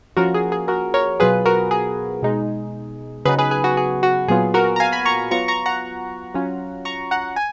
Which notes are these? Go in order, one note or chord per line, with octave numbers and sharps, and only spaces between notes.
F3 A#3 C#4 F4 F#4 A#4
G#4
G#4
F#4 A#4
A#4 C#5
B2 F#3 B3 F4 G#4 B4
F#4 A#4
G#4
B2 G#3 D#4
C#3 F#3 B3 D#4 G#4 B4
G#4 B4
G#4
F#4
G#4
F#4
A#2 F#3 B3 F4 G#4
F#4 A#4
A#5
F5 G#5
G#5 B5
A#5 C#6
F#3 B3 F4 A#5 C#6
A#5 C#6
F#5 A#5
F#3 C#4 F4
A#5 C#6
F#5 A#5
G#5